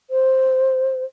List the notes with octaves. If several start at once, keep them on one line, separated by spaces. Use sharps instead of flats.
C5